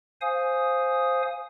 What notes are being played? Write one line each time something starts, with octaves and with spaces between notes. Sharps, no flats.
C5 F5 G#5 D#6